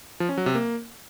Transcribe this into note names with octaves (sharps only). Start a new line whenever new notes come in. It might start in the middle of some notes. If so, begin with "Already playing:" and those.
F3
C#4
F#3
C3
A#3